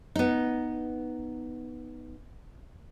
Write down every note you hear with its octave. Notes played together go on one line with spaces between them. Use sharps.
B3 D#4